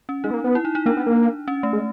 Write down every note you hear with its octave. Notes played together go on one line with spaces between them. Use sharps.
C#4
G#3 D#4
B3
A#3
B3
E4
D#4
D#4
A#3 D4
B3
A#3
C#4
A3
G#3